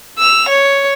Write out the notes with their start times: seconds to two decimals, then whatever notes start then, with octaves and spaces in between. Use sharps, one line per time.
0.19 E6 F7
0.49 C#5